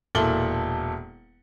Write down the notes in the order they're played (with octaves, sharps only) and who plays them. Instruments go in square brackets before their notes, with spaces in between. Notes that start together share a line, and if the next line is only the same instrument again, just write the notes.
[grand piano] E1 A#2 E4 A4 F#7 G7